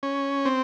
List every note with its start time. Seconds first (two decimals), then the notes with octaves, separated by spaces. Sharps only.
0.03 C#4
0.45 C4